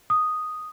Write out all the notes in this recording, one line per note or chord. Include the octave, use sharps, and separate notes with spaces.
D#6